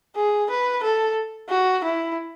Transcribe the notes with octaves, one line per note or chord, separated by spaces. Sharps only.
G#4
B4
A4
F#4
E4